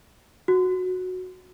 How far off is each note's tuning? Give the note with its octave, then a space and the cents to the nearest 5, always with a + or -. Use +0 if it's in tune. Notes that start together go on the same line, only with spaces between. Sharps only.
F#4 -10